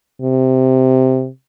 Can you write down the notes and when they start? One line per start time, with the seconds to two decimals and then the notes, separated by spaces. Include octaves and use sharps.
0.22 C3